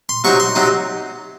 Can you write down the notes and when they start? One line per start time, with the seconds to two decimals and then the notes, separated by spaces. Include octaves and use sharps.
0.09 C6
0.24 C3 F#3 C4 D#4 C#6
0.40 C6
0.55 C3 F#3 C4 D#4